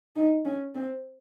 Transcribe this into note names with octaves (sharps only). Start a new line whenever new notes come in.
D#4
C#4
C4